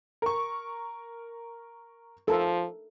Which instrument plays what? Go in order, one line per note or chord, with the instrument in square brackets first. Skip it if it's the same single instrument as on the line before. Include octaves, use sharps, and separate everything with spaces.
[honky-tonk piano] A#4 C#6
[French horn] F3 [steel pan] A4 A#4